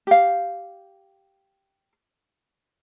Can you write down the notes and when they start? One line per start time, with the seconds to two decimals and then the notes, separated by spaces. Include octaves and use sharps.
0.07 G4 F5